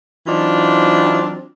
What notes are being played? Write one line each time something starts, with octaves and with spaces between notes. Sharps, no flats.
E3 F#3 C4 D4 D#4 F4